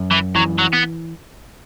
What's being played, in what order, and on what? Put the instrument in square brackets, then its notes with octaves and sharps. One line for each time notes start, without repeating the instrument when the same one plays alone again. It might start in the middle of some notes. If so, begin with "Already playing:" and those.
Already playing: [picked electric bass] F#2
[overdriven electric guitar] E3
[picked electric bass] E3 [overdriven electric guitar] F#3
[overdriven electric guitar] F#3
B3